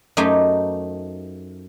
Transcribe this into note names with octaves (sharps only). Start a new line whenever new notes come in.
F#2 A3 D#4 G4 C5 G#5